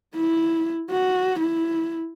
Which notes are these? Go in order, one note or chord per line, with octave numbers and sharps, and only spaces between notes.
E4
F#4
E4